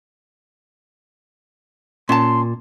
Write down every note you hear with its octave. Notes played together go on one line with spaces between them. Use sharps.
A#2 C#4 A5 C6